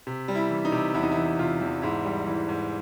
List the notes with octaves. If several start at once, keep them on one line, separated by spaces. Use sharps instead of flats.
C3
G3
E4
E3
D#4
C3
E2 E4
D#4
E4
E3
C3 F4
E2
G#2 E4
G3
E3
G#2